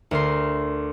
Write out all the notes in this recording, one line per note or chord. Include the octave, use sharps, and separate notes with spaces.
D2 A#4 C6